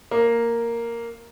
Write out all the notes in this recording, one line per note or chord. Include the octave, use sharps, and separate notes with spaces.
A#3